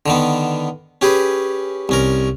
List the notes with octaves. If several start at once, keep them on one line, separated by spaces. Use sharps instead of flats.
D3 D#3 B3
C#4 G4 G#4 B4
C2 C#4 A#4